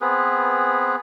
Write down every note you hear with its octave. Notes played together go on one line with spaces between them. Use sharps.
B3 C4 G#4 B4